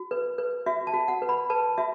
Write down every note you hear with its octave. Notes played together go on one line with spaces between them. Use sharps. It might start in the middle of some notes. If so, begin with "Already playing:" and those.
Already playing: F#4
B4
B4
F#4 E5
A5
F#4
F#5
B4
B5
B4 A5
F#4 E5